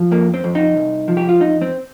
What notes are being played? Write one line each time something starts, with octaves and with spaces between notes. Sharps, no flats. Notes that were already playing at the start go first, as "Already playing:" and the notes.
Already playing: F3
F2 A#3
C4
F2
D#4
C2
F3
G4
F4
F2 D#4
C4